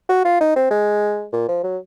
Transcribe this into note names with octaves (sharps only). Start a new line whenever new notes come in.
F#4
F4
D#4
C4
G#3
A#2
F3
F#3